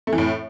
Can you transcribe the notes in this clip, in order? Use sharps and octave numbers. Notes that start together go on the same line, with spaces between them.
A3
E3
A2